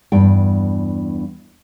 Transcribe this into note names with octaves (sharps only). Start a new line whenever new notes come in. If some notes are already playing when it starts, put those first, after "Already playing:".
E2 G2 G5